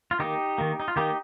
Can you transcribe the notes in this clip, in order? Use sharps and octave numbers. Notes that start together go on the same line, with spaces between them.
F4
D#3 A#3 D#4 G4
D#3 A#3
D#4
F4
D#3 A#3 D#4 G4